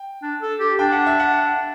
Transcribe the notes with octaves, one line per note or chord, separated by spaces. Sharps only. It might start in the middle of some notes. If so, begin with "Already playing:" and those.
Already playing: G5
D4
A4
G4
D4 G5
F#5
E5
F#5